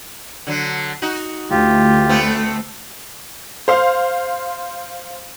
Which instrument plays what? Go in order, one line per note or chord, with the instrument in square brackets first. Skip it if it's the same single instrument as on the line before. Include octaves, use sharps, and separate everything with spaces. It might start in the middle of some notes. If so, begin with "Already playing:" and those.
[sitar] D3 F#3
D#4 F#4
[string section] D2 [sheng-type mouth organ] F4 G4
[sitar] A3 B3 C4
[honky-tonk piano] C5 F5